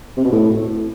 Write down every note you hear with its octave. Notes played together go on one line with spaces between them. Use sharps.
C3
B2
A2